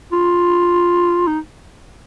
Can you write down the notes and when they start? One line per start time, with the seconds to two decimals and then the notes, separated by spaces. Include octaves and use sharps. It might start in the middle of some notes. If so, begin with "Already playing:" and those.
0.12 F4
1.27 D#4